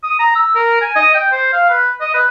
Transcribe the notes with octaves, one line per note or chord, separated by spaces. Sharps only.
D#6
A#5
E6
A#4
G#5
D#5
G5
C5
F5
B4
D#5
B4